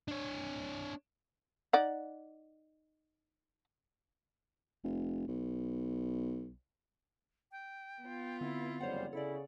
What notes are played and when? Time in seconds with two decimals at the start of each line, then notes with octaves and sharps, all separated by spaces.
0.08 D4 C#5
1.73 D#4 D5 F#5
4.84 F1
5.28 B1
7.52 G5
8.02 B3 F4
8.41 D3 C4 E4
8.80 F#1 F2 G3 C5 C#5 F#5
9.13 C#3 E4 A4 D5